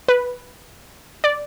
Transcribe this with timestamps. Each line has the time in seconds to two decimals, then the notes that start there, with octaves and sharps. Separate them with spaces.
0.08 B4
1.24 D5